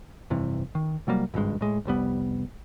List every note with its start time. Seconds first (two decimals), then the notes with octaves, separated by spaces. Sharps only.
0.30 F1 G2 C3 E3
0.75 D#3
1.07 C3 F#3 G3 A#3
1.34 G#1 C#2 G2 G#3
1.61 A2 G#3
1.85 F1 C2 G3 B3